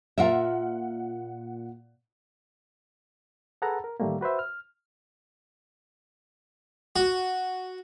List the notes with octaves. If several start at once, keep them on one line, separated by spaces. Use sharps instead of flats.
A#2 F4 A#4 E5 F#5
G#4 A4 B4 F#5 A5 A#5
A#4
A2 D#3 E3 G3 A3 A#3
F#4 B4 C5 E5
F6
F#4